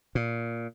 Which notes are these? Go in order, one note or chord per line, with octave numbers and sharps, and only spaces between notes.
A#2